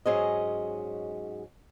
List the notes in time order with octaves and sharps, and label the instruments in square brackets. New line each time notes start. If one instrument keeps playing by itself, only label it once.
[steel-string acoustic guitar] G#2 F#3 C#4 G#4 C5 D#5